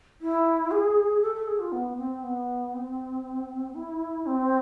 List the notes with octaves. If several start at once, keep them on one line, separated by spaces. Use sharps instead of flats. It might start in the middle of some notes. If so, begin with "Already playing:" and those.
E4
G#4
A4
A4
G#4
F4
B3
C4
B3
C4
E4
C4